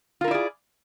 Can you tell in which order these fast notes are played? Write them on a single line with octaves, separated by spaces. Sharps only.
F4 A#4 E4 D5 G#4